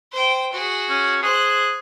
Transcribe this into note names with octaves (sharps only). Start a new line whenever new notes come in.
C5 G5
F#4 G#4
C#4
G#4 C5 F#6